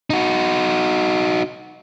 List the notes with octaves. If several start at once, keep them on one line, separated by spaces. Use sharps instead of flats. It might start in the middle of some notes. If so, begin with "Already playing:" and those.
D#4 F#4